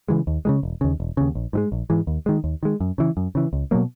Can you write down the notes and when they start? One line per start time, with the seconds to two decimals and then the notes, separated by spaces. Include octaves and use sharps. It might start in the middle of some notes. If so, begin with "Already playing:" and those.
0.08 C#3 E3 G#3
0.27 D#2
0.45 C#3 E3 G#3
0.63 E1
0.81 D#2 C#3
1.00 E1
1.17 D#2 C#3
1.35 A#1
1.53 G#2 E3 G#3
1.72 A#1
1.90 G#2 E3 G#3
2.07 D#2
2.26 D#3 G#3
2.44 D#2
2.63 D#3 G#3
2.81 F#2
2.98 C#3 E3
3.17 F#2
3.35 C#3 E3
3.53 C#2
3.71 B2 F#3 A#3